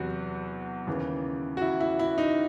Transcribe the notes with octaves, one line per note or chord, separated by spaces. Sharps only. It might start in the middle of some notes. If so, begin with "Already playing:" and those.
Already playing: E2 C3 F#3 F#4
D#2 C#3 E3
F#4
E4
E4
E4
D#4